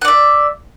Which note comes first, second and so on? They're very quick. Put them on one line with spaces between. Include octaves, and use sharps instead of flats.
F#5 D5 E5